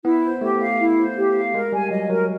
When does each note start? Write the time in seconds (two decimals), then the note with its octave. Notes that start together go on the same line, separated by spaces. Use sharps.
0.05 B3 E4
0.23 C5
0.41 A3 G4
0.61 F5
0.79 E4
0.98 C5
1.17 G4
1.35 F5
1.54 G#3 A#4
1.72 G3 G#5
1.91 F#3 D#5
2.09 F#3 A#4